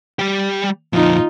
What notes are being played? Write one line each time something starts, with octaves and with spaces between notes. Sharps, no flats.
G3 G4
F2 A#2 D#4 F4